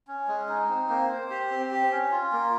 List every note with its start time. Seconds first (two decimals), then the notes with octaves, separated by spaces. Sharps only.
0.07 C#4
0.28 G#3
0.49 D#4
0.69 C4
0.89 A#3
1.09 C5
1.30 G4
1.51 C4
1.71 G4
1.91 C#4
2.11 F4
2.32 A#3